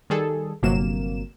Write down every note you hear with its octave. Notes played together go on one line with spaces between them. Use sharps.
D#3 G3 G#4 A4
G1 C3 F#3 A#3 E7